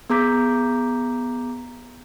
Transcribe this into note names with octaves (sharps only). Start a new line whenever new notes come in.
B3 G#4 A#5 D6 G6 B6